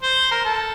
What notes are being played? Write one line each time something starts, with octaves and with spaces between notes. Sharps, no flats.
C5
A#4
A4